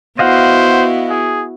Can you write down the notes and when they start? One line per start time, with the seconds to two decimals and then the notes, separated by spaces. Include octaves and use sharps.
0.19 B3 E4 F#4 C5 D#5 F5 F#5
1.10 G#4